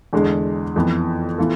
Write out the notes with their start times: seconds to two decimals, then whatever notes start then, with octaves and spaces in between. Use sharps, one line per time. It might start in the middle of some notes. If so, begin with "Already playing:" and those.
0.13 E2 D3 G#3
0.76 F2 E3 B3
1.38 E3 B3 F4 A4